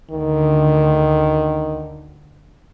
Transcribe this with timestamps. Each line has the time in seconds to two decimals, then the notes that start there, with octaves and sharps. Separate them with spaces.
0.11 D2 D3 D#3